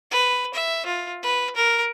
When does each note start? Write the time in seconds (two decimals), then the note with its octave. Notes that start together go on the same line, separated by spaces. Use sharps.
0.11 B4
0.54 E5
0.86 F4
1.23 B4
1.56 A#4